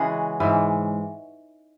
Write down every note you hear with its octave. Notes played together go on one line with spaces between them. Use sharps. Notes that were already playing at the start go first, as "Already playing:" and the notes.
Already playing: C#3 E3 G#3 F#4 G#4
G#2 E3 G#3